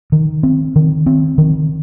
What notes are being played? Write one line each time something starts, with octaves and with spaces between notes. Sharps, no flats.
D#3
C4
D#3
C4
D#3